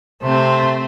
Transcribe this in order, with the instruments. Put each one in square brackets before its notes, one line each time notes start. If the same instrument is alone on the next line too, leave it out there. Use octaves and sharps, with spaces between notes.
[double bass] C3 [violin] A3 C4 [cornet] C5